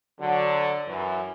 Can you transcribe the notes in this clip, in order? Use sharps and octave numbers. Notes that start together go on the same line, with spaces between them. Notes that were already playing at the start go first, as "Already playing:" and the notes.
D3 F#3
F#2 E3